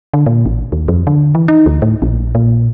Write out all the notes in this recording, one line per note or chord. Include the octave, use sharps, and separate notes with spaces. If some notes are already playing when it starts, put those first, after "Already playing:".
D3
A#2
A1
D#2
F2
D3
E3
D#4
D2
A2
A#1
A#2